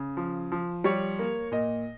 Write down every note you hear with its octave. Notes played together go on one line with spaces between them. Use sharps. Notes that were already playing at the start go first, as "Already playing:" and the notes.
Already playing: C#3
F3
F3
G3 C#5
A#3
A#2 D#5